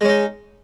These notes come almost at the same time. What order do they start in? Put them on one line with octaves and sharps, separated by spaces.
G#3 C#4 D#4